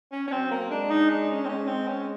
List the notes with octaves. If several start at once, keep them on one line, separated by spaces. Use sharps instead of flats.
C#4
C#4
F#3 C4
A#3
G#3 D4
D#4
D4
C#4
C4
G#3 C#4
C4
C#4